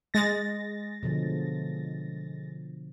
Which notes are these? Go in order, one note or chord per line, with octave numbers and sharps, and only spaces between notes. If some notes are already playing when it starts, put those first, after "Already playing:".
G#3 A6 A#6
B2 D3 F3